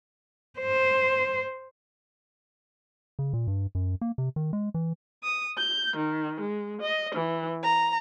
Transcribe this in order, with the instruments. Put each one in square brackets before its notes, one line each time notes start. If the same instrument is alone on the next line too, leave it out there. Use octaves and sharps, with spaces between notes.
[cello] C5
[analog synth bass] C#3
A#2
G2
F#2
A#3
C3
D#3
G#3
E3
[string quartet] D#6
G6
D#3
G#3
D#5
E3
A#5